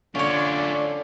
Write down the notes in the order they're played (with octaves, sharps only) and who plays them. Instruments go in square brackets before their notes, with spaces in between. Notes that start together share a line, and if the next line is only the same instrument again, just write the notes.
[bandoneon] D3 [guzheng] C#4 C#5 [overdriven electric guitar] D4 F4 [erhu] D5